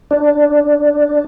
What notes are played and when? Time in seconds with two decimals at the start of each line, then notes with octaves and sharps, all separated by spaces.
0.11 D4